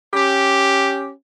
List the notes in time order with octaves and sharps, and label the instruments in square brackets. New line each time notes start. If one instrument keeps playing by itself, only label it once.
[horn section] C#4 G4